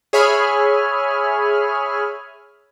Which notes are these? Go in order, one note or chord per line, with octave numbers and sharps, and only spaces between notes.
G#4 C#5 E5 G#5 B5 F6